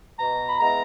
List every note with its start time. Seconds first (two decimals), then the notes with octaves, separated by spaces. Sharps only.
0.19 B2 A#5
0.49 B5
0.59 G#3 B3 E4 A#5